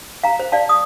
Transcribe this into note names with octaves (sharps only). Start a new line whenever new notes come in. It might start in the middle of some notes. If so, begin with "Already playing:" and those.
F5 A#5
C5
D5 F5 A5
D#6